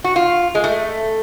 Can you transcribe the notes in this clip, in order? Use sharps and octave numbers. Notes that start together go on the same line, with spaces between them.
F#4
F4
G#3
A3